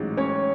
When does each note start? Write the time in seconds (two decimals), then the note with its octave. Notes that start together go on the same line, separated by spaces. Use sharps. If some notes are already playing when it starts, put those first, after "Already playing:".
Already playing: A1 G#2 F#3
0.17 C#4 C#5